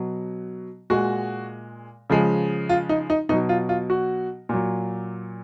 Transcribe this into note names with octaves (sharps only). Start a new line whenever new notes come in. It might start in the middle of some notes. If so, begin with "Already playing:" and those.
Already playing: B2 F#3
A#2 G#3 F#4
C#3 F3 G#3
F4
D#4
D#4
B2 F#3 D#4
F4
F4
F#4
A#2 F#3